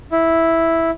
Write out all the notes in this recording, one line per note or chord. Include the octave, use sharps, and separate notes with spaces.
E4